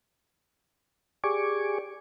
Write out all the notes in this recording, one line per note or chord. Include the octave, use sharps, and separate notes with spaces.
G4 G#4 D5 G#5 C#6 D6